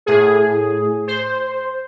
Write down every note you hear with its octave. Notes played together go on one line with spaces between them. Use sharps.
A2 G#4
C5